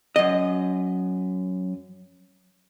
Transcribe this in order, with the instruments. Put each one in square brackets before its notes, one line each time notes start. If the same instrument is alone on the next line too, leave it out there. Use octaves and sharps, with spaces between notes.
[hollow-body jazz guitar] F#2 D#5